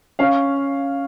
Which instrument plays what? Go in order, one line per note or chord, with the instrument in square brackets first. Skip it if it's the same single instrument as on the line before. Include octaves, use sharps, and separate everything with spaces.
[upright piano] C#4 F5